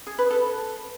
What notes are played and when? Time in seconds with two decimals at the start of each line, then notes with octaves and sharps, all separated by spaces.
0.07 G#4
0.19 B4
0.31 A4